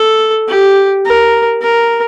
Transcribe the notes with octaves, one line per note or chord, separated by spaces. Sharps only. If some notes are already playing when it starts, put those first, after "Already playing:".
Already playing: A4
G4
A#4
A#4